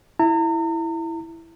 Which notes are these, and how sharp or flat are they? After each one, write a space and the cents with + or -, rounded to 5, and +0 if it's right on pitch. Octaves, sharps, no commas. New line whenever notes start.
E4 +0 A#5 -40